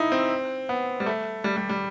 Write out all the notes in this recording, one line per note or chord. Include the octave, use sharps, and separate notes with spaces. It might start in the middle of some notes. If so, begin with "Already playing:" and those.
Already playing: D#4 E4
C4
B3
G3
A3
G3
G3
G3